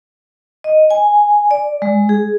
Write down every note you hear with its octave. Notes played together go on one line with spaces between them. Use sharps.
D#5
G#5
D5
G#3
G#4